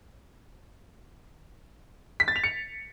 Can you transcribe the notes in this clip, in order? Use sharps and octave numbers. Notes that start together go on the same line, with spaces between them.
B6
A6
F7
C#7